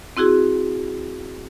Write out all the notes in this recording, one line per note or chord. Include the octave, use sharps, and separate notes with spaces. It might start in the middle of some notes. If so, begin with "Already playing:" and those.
C4 E4 F#4 G#4